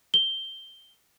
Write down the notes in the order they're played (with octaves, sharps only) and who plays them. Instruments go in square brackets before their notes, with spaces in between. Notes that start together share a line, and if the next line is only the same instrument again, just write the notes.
[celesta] G7